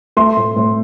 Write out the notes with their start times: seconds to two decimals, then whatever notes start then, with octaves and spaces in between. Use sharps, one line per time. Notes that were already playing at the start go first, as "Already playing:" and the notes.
0.17 A3 C6
0.37 A2
0.56 A2